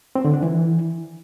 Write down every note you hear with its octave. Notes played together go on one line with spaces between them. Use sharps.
C4
D3
D4
E3